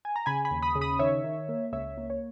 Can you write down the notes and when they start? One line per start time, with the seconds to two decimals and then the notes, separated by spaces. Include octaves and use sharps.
0.05 G#5
0.16 A#5
0.26 C#3 G#5 B5
0.45 G#5 B5
0.51 D#2
0.62 B5 D#6
0.75 C#3
0.81 B5 D#6
0.99 D#3 C#5 E5
1.24 D#3
1.49 A#3
1.72 C#2 C#5 E5
1.97 A#3
2.10 C#5